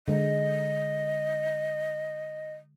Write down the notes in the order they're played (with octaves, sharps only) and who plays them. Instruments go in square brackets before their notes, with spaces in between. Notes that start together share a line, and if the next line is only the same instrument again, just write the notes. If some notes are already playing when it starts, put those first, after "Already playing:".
[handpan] D3 G#3 [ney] D#5